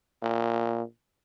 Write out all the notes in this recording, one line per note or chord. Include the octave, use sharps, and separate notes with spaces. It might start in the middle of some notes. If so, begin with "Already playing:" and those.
A#2